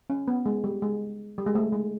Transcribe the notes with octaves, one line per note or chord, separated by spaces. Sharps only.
C#4
B3
G#3
G3
G#3
G3
G#3
A3
G#3